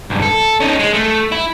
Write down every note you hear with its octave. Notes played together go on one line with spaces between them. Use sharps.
B1 G2
A4
C#4 D#4
G#3
A3
E4